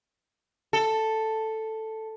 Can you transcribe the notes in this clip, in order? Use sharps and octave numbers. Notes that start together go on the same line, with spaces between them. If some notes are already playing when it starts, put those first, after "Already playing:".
A4